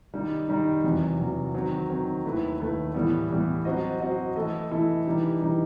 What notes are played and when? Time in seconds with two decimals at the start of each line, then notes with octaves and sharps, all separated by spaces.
0.13 D#3 G3 D#4
0.48 D#3 G3 D#4
0.84 E2 C3 F#3
1.19 E2 C3 F#3
1.54 D#3 F#3 C4
1.90 D#3 F#3 C4
2.25 D#2 D#3 A3 E4 B4
2.60 D#2 D#3 A3 E4 B4
2.94 A2 E3 G3 B3
3.30 A2 E3 G3 B3
3.65 F#3 C4 F#4 C5 D#5
4.00 F#3 C4 F#4 C5 D#5
4.36 E3 A3 E4 A4 D#5
4.71 E3 A3 E4 A4 D#5
5.06 E3 G3 D#4 G4
5.41 E3 G3 D#4 G4